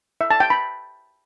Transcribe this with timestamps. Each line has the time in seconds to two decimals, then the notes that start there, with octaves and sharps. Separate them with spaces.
0.21 E5
0.30 A5
0.40 G5
0.50 B5